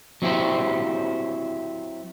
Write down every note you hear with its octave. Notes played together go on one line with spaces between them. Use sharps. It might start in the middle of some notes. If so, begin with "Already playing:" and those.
F#3 C4 E4 G4 C5